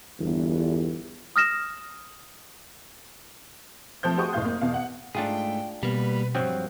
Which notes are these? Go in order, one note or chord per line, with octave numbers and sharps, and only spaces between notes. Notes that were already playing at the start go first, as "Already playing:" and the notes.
G1 E2
D#6 F6 A#6 E7
F3 A3 C4 G6
F#4 G#4 C5 G5 C#6 D#6
F#1 A2 F5 G6
A#3
E2 B2 F5
F#5
G#2 A3 D4 F4 G#4 G5
B2 G3 A#3 B4
B1 G2 F3 F#3 C4 F4